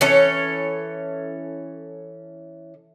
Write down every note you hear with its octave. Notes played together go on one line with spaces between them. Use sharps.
E3 C#4 A4 C#5